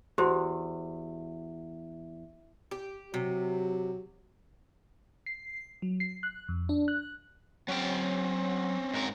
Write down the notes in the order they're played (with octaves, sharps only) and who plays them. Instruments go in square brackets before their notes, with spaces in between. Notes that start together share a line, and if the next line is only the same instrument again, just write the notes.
[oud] E2 [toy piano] F#4 G4 C5
[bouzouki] G4
[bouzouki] C3 [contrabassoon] F#3
[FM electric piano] C7
F#3
C7
F#6
F2
D4
F#6
[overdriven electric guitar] F#3 G5 [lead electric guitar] C4 C#4
[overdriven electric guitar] G#2 A#4